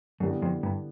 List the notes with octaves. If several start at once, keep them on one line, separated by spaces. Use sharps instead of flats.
F#2 D3 G3 B3 E4 G4
F2
G2